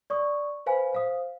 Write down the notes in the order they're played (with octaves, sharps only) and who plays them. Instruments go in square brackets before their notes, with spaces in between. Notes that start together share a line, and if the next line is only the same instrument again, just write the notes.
[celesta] D5 C#6 D#6
B4 C5 F5 G#5 B5
C5 F5 D#6